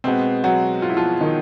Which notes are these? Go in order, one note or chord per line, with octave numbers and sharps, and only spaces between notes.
B2 G#3 B3 C4
F#3 F#4
F4
E4
F3 F4
D#3 D#4